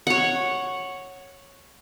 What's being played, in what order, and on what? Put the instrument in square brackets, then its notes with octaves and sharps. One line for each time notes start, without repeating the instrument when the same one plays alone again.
[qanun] C#5 F#5